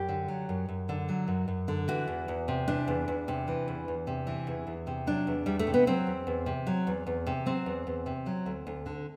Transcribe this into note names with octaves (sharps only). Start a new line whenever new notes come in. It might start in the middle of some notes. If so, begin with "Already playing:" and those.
Already playing: F#2 G4
D3
F#3
F#2
F#2
D3
F#3
F#2
F#2
D3
E3 F#4
E2
E2
C3
E3 D4
E2
E2
C3
E3
E2
E2
C3
E3
E2
E2
C3
F#3 D4
E2
E2 G3
A3
C3
B3
F#3 C4
E2
E2
C3
F#3
E2
E2
C3
F#3 C4
E2
E2
C3
F#3
D2
D2
D3